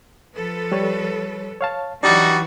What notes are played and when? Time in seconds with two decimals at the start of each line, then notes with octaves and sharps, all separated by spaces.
0.34 F3 A4 B4
0.72 G3 C#5
1.61 C#5 F5 A5
2.03 E3 F#3 G3 D4 D#4 F#4